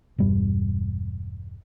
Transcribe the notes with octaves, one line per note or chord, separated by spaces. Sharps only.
E1 G2 G3